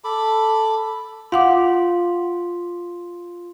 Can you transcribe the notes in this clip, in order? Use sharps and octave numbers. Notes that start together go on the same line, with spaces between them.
A4 B5 D6
F4 F5 F#5 D6